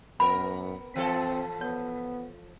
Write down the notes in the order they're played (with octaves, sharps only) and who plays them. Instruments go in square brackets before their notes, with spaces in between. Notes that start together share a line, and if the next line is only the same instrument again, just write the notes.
[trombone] F#2 [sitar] B3 A#4 [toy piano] B5
[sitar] E3 F3 A4 [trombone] C4
[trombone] B3 [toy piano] C#5